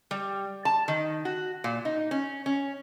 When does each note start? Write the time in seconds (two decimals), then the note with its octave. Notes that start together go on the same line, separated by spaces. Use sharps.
0.11 G3
0.65 A5
0.88 D#3
1.25 F#4
1.64 A#2
1.85 D#4
2.11 C#4
2.46 C#4